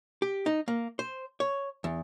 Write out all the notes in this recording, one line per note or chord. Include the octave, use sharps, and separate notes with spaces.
G4
D#4
A#3
C5
C#5
E2